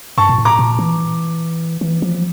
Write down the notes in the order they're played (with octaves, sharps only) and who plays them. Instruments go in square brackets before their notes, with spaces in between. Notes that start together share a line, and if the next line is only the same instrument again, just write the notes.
[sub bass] G2 [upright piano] A5 C#6
[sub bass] A#2
A2
[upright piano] A#5 D6
[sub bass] A#2
E3
E3
F3